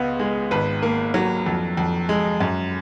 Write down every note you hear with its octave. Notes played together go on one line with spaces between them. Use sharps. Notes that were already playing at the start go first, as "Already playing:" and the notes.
Already playing: C#2 B3
G#3
G#1 B4
A#3
F#3
F2
F2
G#3
F#2